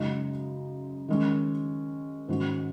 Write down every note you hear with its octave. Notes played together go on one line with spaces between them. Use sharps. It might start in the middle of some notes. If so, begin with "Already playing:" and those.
Already playing: F#2 C#3 G#3 D#4
D#3 G#3 C#4
G#2 D#3 G#3 C#4 F#4